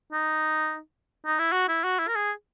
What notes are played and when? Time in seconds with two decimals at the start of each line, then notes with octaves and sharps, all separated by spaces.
0.12 D#4
1.26 D#4
1.39 E4
1.52 F#4
1.68 E4
1.84 F#4
1.99 E4
2.08 A#4
2.15 G#4